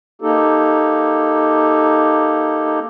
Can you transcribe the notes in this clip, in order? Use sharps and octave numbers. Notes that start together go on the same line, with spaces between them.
A#3 D#4 G4 A4